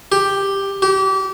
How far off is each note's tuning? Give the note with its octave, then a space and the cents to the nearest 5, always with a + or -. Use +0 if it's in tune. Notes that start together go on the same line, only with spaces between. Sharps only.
G4 +5
G4 -30